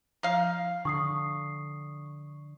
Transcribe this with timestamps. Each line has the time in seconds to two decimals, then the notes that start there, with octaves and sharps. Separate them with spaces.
0.23 F3 D#4 F5
0.85 D3 C#6 D#6 C7